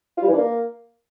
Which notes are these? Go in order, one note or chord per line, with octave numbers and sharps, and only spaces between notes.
F4
G3
E3
D4
A#3